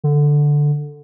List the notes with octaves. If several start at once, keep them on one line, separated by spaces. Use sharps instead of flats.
D3